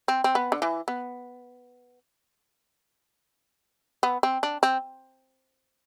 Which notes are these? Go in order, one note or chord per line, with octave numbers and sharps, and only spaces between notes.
C4
C4
B3
D3
E3
B3
B3
C4
D4
C4